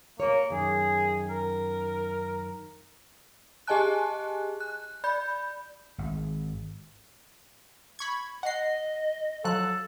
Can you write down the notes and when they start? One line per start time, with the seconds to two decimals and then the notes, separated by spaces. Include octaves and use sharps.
0.20 A#3 C#5
0.50 F#2 D#3 G#4
1.29 A#4
3.67 G4 G#4 D#5 G#5 A5 F#6
4.60 F#6
5.04 D5 B5 G6
5.98 G#1
7.99 B5 C#6 G#6
8.43 D#5 F#5 C7
9.44 F3 F#3 A4 F#6